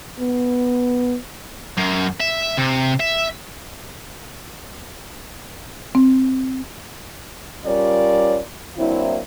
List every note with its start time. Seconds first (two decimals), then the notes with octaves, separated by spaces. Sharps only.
0.20 B3
1.77 F#2
2.20 E5
2.58 C3
3.00 E5
5.95 C4
7.64 G3 C#4 F4 A#4 C#5 D5
8.77 F#3 A#3 C4 D4 E4